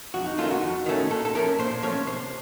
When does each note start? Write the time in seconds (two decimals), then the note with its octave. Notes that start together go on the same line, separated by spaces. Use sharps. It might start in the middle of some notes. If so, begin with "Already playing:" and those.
0.14 F2 F#4
0.26 D#4
0.38 D#3 A3 C#4 F4
0.51 F#4
0.62 F2
0.86 D#3 A3 C#4
1.10 A#2 A4
1.25 A4
1.35 F3 A3 C#4 A#4
1.59 A#2 C5
1.83 F3 A3 C#4 C#5
2.06 C3 C5